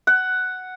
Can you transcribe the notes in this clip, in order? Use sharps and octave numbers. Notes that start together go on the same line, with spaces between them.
F#5